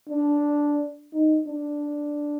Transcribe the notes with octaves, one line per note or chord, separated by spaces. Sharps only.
D4
D#4
D4